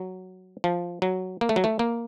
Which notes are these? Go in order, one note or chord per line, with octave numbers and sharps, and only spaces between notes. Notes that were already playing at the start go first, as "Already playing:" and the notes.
Already playing: F#3
F3
F#3
A#3
A3
F#3
A3
A#3